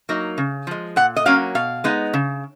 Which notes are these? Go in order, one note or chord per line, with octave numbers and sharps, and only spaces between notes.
F#3 A#3 D#4
C#3
F3 G#3
A#2 F#5
D#5
F#3 A#3 C#4 F5
B2 F5
G#3 B3 D#4
C#3